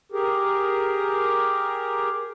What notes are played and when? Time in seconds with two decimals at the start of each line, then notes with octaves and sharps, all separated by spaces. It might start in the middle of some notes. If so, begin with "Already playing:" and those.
0.12 G4 G#4 A#4